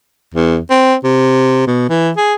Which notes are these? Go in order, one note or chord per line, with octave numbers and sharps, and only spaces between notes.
E2
C4
C3
B2
E3
G#4